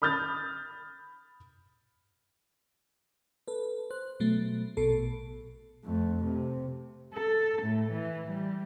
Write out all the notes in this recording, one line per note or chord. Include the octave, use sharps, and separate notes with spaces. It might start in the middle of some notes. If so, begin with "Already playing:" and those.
B5 D#6 F6 G6 A6
A4 B4
C5 F#6
B2 F#3 A3
A#1 B2 A4
F2 A3
C3
A4
A2
E3
G3